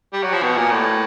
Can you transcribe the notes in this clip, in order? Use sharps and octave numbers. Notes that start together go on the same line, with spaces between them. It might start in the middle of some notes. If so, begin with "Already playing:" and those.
G3
F#3
F3
B2
A#2
A2